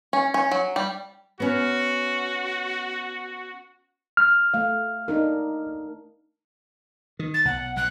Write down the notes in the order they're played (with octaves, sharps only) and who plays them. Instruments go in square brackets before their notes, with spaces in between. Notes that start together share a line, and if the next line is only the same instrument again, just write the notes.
[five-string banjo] C#4
C#4
F#3
G3
[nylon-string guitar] B3 C#4 [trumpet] F#4
[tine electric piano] F6
[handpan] A3 F5
D4 D#4 A#4
[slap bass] D#3
[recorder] A6
[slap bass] B1 [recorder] F#5
[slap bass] B1 [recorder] F#6